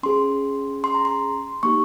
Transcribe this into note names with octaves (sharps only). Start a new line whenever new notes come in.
C#4 G#4 C6
C6
A#5
C6
A#3 D#4 G4 C#6